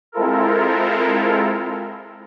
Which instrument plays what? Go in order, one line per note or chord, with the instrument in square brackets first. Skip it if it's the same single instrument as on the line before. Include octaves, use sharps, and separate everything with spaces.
[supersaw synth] G#3 C4 E4 F4 A4 A#4